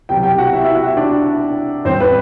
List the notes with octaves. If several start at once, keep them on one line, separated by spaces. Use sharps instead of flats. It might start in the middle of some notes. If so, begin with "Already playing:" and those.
C2 B2 F#3 G4 G5
G4 G5
F#4 F#5
E4 E5
E4 E5
F#4 F#5
E4 E5
D4 D5
A1 A2 E3 G3 C4 C5
B3 B4